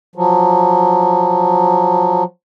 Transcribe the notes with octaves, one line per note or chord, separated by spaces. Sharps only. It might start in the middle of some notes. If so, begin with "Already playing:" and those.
F3 F#3